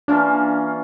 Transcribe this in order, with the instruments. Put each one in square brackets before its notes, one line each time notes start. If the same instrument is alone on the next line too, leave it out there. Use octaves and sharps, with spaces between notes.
[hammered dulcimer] E3 A#3 C#4 F4 [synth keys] D4